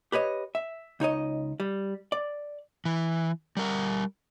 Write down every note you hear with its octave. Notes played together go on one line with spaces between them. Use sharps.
G4 B4 C#5 D#5
E5
C#2 D#4 C#5 D#5
G3
D5
E3
G3 A#4